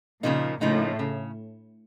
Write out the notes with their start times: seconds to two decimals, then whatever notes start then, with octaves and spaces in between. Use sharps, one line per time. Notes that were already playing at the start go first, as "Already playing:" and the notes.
0.23 A#2 C#3 F3 A#3 D#4
0.61 A2 C#3 F3 A#3 D#4
0.99 C#3